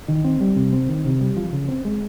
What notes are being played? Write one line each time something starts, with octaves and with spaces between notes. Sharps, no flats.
D#3
C4
G3
C3
C4
D#3
C3
G3
F3
C#3
C4
G#3